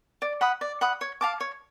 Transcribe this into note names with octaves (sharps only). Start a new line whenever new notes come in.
D5
F#5 B5 D#6
D5
F#5 B5 D#6
C#5
F5 A5 D6
C#5